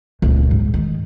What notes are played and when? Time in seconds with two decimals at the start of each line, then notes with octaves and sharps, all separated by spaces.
0.22 D#1 C#2
0.51 G#2
0.74 D#3